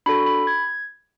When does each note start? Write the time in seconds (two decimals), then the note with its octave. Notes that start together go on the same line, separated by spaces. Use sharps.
0.06 D4 F#4 A4 B5
0.26 B5
0.47 G#6